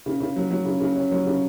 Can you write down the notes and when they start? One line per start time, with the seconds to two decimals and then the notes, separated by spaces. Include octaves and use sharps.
0.06 C#3
0.20 C#3
0.36 F#3
0.51 F#3
0.65 C#3
0.80 C#3
0.96 C#4
1.11 F#3
1.27 C#3